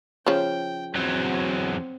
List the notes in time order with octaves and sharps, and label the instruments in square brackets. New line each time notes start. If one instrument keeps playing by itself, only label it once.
[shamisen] C#3 F3 [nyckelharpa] G5
[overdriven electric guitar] E2 F#3 [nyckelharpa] C4